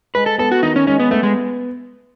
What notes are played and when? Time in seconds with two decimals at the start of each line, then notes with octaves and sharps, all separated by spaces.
0.15 G#3 B4
0.26 A4
0.38 B3 A4
0.52 F#4
0.63 D#3 D#4
0.76 C#4
0.87 G#3 C#4
1.00 B3
1.11 A3 B3
1.23 G#3